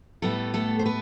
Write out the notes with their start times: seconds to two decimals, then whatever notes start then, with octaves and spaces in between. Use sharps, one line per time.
0.22 A2 G3 A3 B3 A4
0.54 A3 A4
0.79 C5
0.86 B3 B4